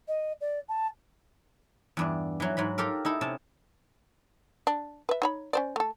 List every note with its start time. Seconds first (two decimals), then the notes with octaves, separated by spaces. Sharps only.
0.08 D#5
0.40 D5
0.69 A5
1.97 E2 G2 D4
2.40 E3 F#3
2.57 G#2 F#3 B5
2.78 F4 G4 A4 A#4
3.05 D#4 E4 A4
3.21 C3 C#4 A5
4.67 D4
5.09 B4 E5
5.22 D#4 C#5 B5
5.53 C#4 C5 D5
5.76 A3 A4